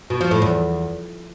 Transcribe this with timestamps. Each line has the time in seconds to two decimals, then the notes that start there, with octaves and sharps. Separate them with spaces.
0.10 B2
0.21 F3
0.31 A2
0.42 E2